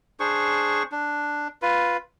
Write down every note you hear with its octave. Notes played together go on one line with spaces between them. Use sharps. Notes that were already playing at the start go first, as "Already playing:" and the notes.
D4 G#4 C5 C#6
D4
F4 B4